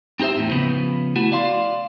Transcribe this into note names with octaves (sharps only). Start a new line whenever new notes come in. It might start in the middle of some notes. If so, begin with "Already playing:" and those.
C4 D#4 G4 C5 E5
E2 A2
C#3 F3 B3
A3 E4 F#4
D5 F5 C6